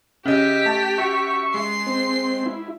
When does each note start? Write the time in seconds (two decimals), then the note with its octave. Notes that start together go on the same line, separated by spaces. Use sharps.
0.26 C#3 C#4 G4 D#5 E5 B6
0.65 A3 A5 A6
0.98 F#4 E5 C#6
1.54 G#3 C6 C7
1.87 C4
2.46 E4